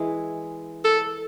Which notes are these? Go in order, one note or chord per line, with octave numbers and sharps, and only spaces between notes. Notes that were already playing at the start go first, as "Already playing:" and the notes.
Already playing: E3 G#3
A4